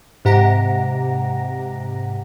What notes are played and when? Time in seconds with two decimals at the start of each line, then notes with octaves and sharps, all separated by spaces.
0.25 G#2 C3 G4 F#5 A#5 A#6